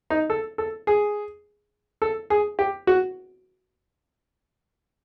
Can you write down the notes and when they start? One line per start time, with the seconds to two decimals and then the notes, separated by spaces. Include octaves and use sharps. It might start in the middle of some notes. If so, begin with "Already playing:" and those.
0.10 D#4
0.30 A4
0.58 A4
0.87 G#4
2.02 A4
2.30 G#4
2.59 G4
2.87 F#4